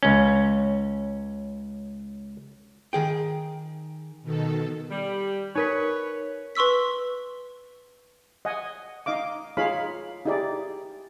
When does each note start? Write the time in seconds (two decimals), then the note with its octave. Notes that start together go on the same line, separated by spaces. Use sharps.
0.03 C#2 C#4
2.93 D#3 G#4 G5
4.22 B2 D#3 A4
4.91 G3
5.55 D#4 A#4 B4 C#5 B6
6.55 B4 C6 C#6 E6 B6
8.45 D#5 F#5 G#5
9.06 D#4 D#5 F5 D6
9.57 D#4 F4 G#4 C#5 F5 B5
10.25 D#4 E4 G4 G#4 D5